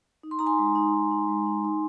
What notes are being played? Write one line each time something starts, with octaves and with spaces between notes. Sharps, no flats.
D#4
C6
D#4 A#5
G#5 C6
G#3
D#4
D#4
D#4
G#3
D#4
D#4